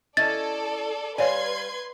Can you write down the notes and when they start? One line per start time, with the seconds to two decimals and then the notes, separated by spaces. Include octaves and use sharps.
0.17 C#4 E4 A4 D5 D#5 A6
1.18 G3 B4 C#5 D5 F5 G#5 C6 G#6